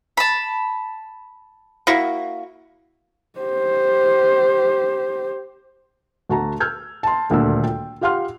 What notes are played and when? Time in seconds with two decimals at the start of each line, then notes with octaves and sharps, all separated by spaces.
0.17 A5 B5
1.87 A#3 E4 F#4
3.39 G4 C5
6.29 D2 F#4 A5 A#5
6.60 E6 F6 G6 G#6
7.03 A5 C6
7.30 D#1 D2 A#2 D4 E6
7.64 G5
8.01 F4 G4 F5 F#5 C6 F6